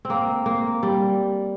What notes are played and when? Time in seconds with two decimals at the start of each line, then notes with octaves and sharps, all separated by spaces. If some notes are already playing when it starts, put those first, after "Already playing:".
0.05 C4
0.10 A#3
0.46 A#3
0.83 G3